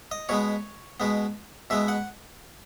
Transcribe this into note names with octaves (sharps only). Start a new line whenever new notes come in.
D#5
B2 G#3 B3 C#5
B2 G#3 B3
B2 G#3 B3 E5
F#5